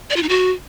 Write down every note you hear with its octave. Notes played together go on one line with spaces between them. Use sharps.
D5
F4
D#4
F#4